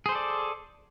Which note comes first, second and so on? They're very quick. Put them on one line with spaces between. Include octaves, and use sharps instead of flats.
G#4 C5 A4 D5